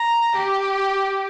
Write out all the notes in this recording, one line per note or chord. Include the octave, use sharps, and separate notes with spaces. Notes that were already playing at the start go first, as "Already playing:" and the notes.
Already playing: A#5
G4